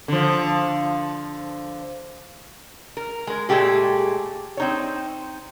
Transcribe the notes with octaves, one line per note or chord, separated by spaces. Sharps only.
D3 F3
A#4
G#3 A#4
A#2 G#3 A3 G4 G#4
C4 D#4 C#5